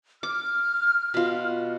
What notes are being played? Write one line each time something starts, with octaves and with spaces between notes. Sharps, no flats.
D6 F6
B2 F4